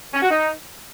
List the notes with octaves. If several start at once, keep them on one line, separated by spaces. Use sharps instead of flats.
C#4
F#4
D#4